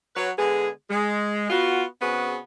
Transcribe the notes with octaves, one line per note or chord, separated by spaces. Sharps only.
F#3 B4 C#5
D3 G#3 B3 G#4
G#3
B3 F4 F#4
C#3 B3 C4 F#4 G#4 B4